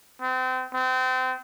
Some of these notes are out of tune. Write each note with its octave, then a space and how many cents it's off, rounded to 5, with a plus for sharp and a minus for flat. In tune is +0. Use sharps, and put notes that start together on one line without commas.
C4 -30
C4 -30